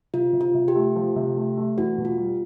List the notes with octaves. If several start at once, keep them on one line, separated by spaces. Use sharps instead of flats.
C3 F4
C3
F4
C3
G4
A3
F3
C3
A3
A3
E2 F#4
B2
F4
G3